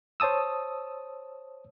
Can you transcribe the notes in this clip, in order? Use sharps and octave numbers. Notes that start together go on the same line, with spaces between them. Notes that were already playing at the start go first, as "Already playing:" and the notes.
C5 C#5 A5 D#6 E6